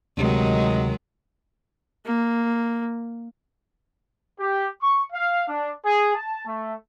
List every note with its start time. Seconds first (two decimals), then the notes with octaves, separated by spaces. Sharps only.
0.17 D2 C3 D#3 F#3 G#3
2.05 A#3
4.40 G4
4.81 C#6
5.13 F5
5.49 D4
5.85 G#4
6.15 A5
6.46 A3